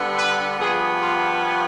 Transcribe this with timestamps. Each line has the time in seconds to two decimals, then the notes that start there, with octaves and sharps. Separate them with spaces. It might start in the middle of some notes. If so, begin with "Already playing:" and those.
Already playing: D3 G3 B3
0.18 B4
0.59 G2 F3 B3 G#4
1.00 F4